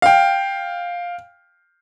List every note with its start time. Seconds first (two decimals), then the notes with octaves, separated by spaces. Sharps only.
0.02 F5 G5